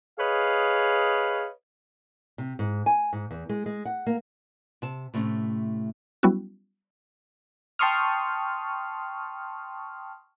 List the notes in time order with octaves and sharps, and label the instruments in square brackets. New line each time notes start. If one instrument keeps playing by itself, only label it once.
[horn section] G#4 B4 C#5 D#5 F5
[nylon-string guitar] C3
G#2
G#5
G#2
E2
G#3
G#3
F#5
A#3
C3 A5
A2 C3 A3 C#4
[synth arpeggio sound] F#3 G3 B3 C#4 E4 F#4
[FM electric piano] G5 A5 C6 C#6 D#6 F6